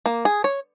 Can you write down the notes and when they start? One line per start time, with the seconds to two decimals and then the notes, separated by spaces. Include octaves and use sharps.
0.06 A#3
0.25 G#4
0.44 C#5